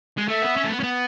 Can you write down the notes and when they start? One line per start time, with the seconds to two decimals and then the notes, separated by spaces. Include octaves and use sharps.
0.18 G#3
0.28 A3 E5
0.42 B3
0.57 C#4
0.64 A3
0.70 B3
0.80 C#4
0.83 B3